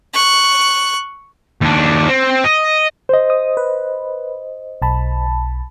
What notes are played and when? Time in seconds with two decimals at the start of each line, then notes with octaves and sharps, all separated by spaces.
0.14 C#6 F#6
1.61 D#2 D4
2.08 C4
2.44 D#5
3.09 C5 D#5
3.30 D#6
3.57 B4
4.82 B1 A5 B5